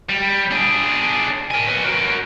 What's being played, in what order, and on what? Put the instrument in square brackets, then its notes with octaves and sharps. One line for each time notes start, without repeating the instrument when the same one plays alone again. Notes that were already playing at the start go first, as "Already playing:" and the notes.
[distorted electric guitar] G3
D4 G#4
A#4 G#5
B4 C#5
F#4 A#4